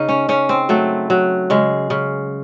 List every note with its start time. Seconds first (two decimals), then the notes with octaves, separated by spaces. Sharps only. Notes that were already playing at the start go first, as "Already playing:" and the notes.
Already playing: C#3 D#4
0.09 C#4
0.29 C#3 C#4
0.49 C4
0.69 F#3 A3
1.10 F#3
1.50 C#3 G#3
1.90 C#3